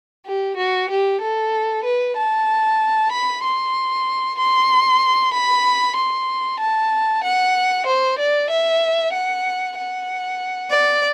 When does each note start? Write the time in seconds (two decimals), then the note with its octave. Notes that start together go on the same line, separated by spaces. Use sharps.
0.25 G4
0.56 F#4
0.89 G4
1.20 A4
1.83 B4
2.15 A5
3.10 B5
3.41 C6
4.37 C6
5.32 B5
5.95 C6
6.59 A5
7.22 F#5
7.86 C5
8.18 D5
8.49 E5
9.12 F#5
9.76 F#5
10.70 D5